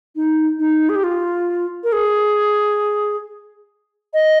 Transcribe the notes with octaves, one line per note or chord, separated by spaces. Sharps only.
D#4
D#4
G#4
G4
F4
A#4
G#4
D#5